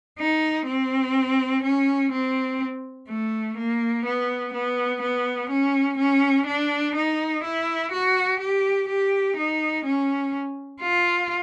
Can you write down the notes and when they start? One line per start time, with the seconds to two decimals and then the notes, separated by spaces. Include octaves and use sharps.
0.19 D#4
0.67 C4
1.64 C#4
2.11 C4
3.09 A3
3.57 A#3
4.05 B3
4.53 B3
5.01 B3
5.50 C#4
5.98 C#4
6.46 D4
6.95 D#4
7.43 E4
7.91 F#4
8.40 G4
8.88 G4
9.36 D#4
9.85 C#4
10.81 F4